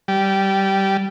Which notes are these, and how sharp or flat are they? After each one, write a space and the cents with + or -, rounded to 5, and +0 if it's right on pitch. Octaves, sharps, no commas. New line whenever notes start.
G3 -15